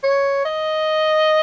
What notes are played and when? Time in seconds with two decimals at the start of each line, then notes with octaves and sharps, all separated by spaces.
0.04 C#5
0.45 D#5